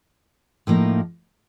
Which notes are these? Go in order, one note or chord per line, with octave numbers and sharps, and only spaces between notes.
A2 F3 A#3 D#4